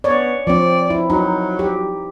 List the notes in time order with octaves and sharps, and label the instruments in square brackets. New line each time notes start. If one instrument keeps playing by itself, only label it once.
[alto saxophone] B3 [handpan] C#5 D5
[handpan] F3 C4 [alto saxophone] D5
[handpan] E4
[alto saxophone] F#3 [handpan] D#4
[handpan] G4